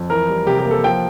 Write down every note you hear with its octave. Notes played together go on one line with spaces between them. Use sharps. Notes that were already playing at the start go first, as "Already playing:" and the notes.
Already playing: F2
E3 A#4
G3
C3 G4
G4
A#3
A4
F3 G5